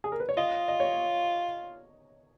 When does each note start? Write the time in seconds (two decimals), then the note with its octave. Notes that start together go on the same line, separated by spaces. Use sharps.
0.04 G#4
0.12 A#4
0.20 B4
0.29 C#5
0.37 F4 D#5
0.68 D#5
0.80 C#5